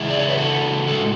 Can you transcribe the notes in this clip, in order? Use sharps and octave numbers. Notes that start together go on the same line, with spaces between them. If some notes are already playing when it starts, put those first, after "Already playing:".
Already playing: C#3 E3 G#3 E4 G#4
D5
C#5
B4
F#4 A4
A2 G#3 F#4 A4